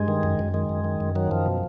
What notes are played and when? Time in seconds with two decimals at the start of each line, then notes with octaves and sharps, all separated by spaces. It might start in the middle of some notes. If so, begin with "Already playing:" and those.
Already playing: G2 G#3
0.08 D#3
0.23 F#2
0.39 F#2
0.54 D#3 G#3
0.69 F#2
0.84 D#3
1.00 F#2
1.15 D#3 F#3
1.31 F#2 F3
1.46 B2